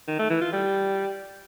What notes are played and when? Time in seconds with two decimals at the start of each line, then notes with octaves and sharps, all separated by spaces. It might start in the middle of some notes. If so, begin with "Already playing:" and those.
0.08 D#3
0.19 A3
0.30 E3
0.41 F4
0.52 G3